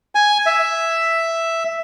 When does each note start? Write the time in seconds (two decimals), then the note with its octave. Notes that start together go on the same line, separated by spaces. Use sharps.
0.15 G#5
0.46 E5